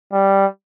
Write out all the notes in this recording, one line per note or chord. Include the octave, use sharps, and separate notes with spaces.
G3